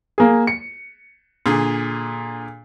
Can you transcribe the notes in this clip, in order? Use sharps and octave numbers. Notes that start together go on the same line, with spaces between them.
A#3 G#4
C#7
A#2 D3 G#4